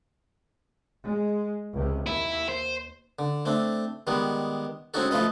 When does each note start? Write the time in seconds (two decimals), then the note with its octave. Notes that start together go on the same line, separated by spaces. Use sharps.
1.04 G#3
1.74 C#2 C3
2.06 D#2 E4
2.49 C5
3.19 D3
3.45 A3 C4 D4
4.07 D#3 G3 G#3 B3
4.94 G#3 C4 C#4 D#4 F#4 A4
5.11 F3 A3 F4 B4 D#5